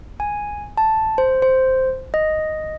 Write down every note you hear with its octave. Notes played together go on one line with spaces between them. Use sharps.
G#5
A5
C5
C5
D#5